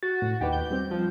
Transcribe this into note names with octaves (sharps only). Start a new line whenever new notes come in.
F#4 A6
A2
D#2 D#4 G4 B4
G6
G3 C4
F3